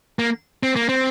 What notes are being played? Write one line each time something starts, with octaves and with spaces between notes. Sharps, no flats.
A#3
C4
A#3
C4